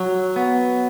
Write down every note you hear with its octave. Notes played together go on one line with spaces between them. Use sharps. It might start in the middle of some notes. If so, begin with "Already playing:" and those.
Already playing: F#3
B3